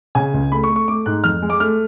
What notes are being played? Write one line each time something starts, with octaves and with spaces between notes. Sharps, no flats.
C#3 G#5
C#2
A3 B5
C#6
A3
C#6
A3 D6
G#2 F#6
F2 F6
G#3
D6
A3 F6